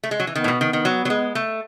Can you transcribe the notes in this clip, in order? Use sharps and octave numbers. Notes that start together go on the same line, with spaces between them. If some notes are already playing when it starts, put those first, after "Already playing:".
A3
G#3
F#3
E3
D#3 B3
A2
B2
D#3
D#3
F#3
F#3
G#3
A3